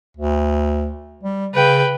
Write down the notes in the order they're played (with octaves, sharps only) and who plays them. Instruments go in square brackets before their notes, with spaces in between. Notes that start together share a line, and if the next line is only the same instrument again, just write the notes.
[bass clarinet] D2
G3
[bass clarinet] C#3 [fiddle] B4 G5